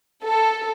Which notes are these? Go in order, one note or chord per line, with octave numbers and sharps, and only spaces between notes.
A4